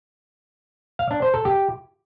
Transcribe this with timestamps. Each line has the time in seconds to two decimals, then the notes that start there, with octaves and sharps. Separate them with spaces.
0.99 F5
1.11 D4
1.22 C5
1.34 A4
1.45 G4